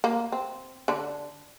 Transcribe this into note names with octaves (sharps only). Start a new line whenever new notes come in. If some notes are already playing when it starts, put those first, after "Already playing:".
A#3
C4
D3 D4